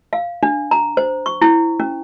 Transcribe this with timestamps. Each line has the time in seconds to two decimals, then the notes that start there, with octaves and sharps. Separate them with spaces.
0.13 F5
0.43 D4
0.71 A#5
0.97 C5
1.26 C#6
1.42 E4
1.80 C#4